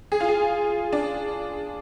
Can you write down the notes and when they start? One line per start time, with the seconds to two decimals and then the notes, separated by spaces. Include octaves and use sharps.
0.12 G#4
0.20 F4
0.29 G#4
0.93 D4